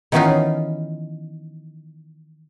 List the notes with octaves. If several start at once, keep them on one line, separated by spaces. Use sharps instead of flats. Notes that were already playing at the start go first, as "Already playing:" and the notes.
D#3 E3 B3 C#4 D#4 F4